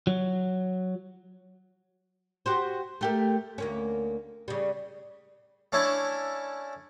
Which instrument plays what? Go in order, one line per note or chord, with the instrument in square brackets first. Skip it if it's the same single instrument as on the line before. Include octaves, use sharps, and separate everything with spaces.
[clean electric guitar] F#3
[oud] F#4 G4 C5
A3 G4 A#4
D2 A#3 C#4
C#3 G3
[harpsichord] A3 C#4 D4 E4